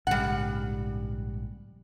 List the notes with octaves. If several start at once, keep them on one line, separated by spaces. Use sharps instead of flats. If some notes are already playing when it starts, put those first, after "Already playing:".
A#1 G#2 C#3 G3 F#5